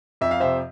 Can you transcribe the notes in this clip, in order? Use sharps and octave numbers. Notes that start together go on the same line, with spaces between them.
F2 E5
F5
C3 C5 E5